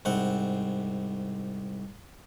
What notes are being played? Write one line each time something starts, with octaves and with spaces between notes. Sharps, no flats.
C2 G#2 C4 F#5